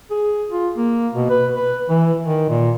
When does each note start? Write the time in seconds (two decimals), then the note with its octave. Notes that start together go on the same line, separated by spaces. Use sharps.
0.11 G#4
0.50 F4
0.77 A#3
1.15 B2
1.30 B4
1.56 B4
1.89 E3
2.25 D#3
2.50 A#2